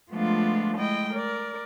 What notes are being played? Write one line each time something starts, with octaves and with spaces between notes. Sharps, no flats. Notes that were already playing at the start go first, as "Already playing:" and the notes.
F3 G#3 A3 B3 D4 F4
G#3 A3 E4 D#5 G5
A#4 D5